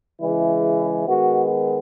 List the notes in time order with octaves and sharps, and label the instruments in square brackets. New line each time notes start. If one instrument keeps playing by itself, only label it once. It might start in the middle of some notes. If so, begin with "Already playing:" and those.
[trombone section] C#3 E3 G#3 E4
D#3 G#3 B3 F#4